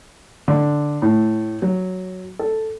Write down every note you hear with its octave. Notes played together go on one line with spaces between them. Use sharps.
D3
A2
F#3
A4